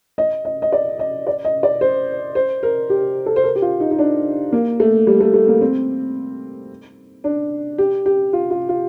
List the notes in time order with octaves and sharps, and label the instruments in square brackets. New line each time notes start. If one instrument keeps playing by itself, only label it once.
[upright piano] D#5
D#5
D#5
D5
D#5
D5
D#5
D5
C5
C5
A#4
G4
A4
C5
A#4
G4
F4
D#4
D#4
D4
A#3
A3
G3
A3
A3
A#3
C4
D4
G4
G4
F4
F4
F4